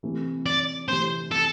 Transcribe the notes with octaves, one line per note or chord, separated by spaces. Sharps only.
C3 E3 A3 C4
D5
C3 E3 A3 C4 C5
A4